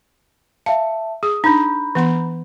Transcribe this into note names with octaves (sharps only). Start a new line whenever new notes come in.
E5 F5 A5
G#4 D#6
D4 D#4 A#5 B5 G6
E3 B3 C6